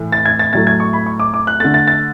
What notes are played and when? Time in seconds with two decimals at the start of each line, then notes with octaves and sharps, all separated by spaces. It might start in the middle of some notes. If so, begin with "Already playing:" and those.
Already playing: A2 E3 A3
0.12 A6
0.26 G#6
0.39 A6
0.53 A2 F#3 A3 A6
0.67 G#6
0.80 C#6
0.93 B5
1.06 C#6
1.19 D6
1.34 D6
1.47 F#6
1.60 D3 A3 A6
1.74 A6
1.87 A6